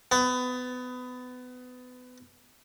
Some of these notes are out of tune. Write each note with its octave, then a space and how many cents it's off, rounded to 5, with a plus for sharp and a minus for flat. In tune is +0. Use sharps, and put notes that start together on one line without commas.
B3 +25